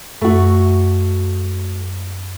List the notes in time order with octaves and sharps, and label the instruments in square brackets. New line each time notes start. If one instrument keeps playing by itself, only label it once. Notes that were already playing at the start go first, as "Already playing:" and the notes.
[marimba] F#2 [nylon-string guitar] A3 F#4